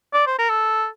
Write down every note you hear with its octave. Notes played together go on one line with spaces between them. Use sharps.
D5
C5
A#4
A4